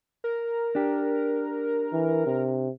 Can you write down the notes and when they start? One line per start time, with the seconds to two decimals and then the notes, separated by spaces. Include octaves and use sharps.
0.24 A#4
0.75 D4 G4
1.93 E3
2.26 C3